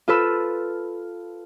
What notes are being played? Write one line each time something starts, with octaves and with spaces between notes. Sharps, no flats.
F4 A4 B4 E6